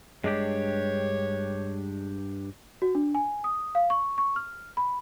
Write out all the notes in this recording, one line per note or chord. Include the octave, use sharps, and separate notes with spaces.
G2 G#3 D4 G4 C#5
F#4
D4
G#5
D#6
F5
C#6
C#6
F6
B5